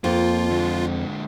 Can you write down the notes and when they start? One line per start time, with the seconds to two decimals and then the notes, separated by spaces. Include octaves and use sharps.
0.04 F2 A#3 F4
0.50 D3 G#3